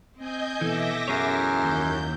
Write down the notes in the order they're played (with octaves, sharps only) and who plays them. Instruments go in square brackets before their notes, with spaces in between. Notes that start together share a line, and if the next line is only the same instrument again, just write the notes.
[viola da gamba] C4 [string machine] D#5 G#5 G6
[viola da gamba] B2 A4 [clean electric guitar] E3 [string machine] E5 D6 A#6
[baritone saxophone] F#2 [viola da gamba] E3 E4 [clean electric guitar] G#4 C#5
[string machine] D#2 G6